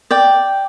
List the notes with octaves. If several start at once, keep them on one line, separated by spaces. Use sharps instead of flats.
D5 G5